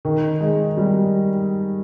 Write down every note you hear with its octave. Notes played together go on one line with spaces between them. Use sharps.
D#3
G#3
G3